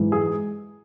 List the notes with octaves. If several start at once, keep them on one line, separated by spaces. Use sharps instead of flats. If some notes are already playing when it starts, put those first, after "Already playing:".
Already playing: G#2 E3 G#3
G#4